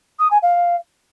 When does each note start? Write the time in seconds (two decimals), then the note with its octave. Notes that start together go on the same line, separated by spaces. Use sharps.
0.19 D#6
0.31 G#5
0.43 F5